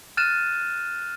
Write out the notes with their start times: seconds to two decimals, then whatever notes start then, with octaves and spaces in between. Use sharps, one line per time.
0.17 F6 F#6 A6 D#7 E7